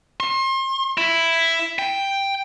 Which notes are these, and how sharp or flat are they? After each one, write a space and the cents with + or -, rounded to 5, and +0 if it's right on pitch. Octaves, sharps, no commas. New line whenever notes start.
C6 +35
E4 +5
G5 +5